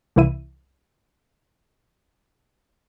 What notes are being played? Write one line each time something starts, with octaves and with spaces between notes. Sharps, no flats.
C2 C3 E3 E4 E5 D#7